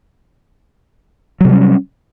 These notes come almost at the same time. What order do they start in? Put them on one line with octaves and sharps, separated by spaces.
F#3 C3 G3 C#4